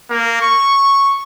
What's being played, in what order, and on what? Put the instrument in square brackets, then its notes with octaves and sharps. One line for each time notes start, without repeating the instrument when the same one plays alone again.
[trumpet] A#3
C#6